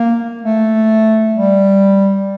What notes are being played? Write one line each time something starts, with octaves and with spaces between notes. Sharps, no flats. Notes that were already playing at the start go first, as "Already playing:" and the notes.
Already playing: A#3
A3
G3